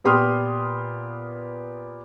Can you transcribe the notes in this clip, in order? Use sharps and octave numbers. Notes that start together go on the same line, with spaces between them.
A#2 B3 G4 C6 D#6 F6